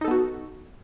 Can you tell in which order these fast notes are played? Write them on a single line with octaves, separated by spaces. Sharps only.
D#4 A4 B3 F#4